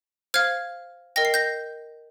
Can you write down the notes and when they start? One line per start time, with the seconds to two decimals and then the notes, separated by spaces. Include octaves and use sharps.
0.34 C5 F5 F6 G#6
1.16 A#4 D#5 G5 A#6
1.25 C7
1.34 G6 A#6